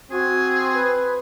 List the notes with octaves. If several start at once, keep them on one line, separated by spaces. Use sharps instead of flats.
C4 F#4 G#4
B4